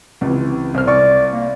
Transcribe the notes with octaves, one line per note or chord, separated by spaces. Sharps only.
C#2 C3 E3
C2 C5 F6
C2 D5 C#6
A#3